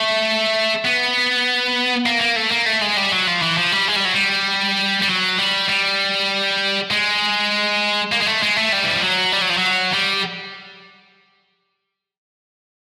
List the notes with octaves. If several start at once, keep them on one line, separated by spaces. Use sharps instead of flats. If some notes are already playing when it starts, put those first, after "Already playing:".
Already playing: A3
B3
A#3
A#3
A3
A#3
A3
G#3
G3
F#3
F3
E3
F3
G3
G#3
G3
F#3
G3
G3
F#3
G3
G3
G#3
A#3
G#3
A3
G#3
A3
G3
E3
F3
F#3
G3
F#3
F3
F#3
G3